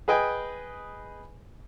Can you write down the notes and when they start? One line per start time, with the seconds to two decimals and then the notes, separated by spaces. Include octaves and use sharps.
0.08 G#4 B4 D#5 G5 G#5